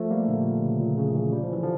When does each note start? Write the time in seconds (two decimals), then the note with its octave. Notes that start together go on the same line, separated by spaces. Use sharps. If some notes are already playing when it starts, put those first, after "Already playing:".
Already playing: F3 A3
0.10 G3 A#3
0.28 A#2 D3
0.63 C#3
0.80 A#2
0.97 C#3
1.15 C#3 E3
1.32 G3
1.43 F3
1.52 E3
1.63 D3 F3